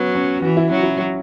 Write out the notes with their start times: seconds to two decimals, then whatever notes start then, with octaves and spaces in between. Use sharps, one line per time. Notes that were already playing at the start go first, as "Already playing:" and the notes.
Already playing: F#3 B3 C#4
0.15 C#4
0.42 E3 F#4
0.57 E4
0.70 F#3 C#4
0.83 E4